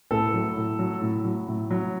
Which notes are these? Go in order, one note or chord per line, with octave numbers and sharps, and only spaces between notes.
A2 A4
F#3
A2
F#3
A2
F#3
A2
F#3